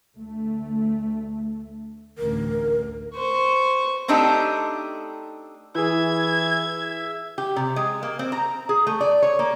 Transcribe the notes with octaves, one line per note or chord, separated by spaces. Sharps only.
D2 A3
A1 D2 A#4
C5 C#6
A3 C4 D4 D#4 G4 A4
E3 E4 G#4 E5 G#6
G4
C3
G#3
A#3
C4
A#5
G#4
A3
D5
C#5
A#3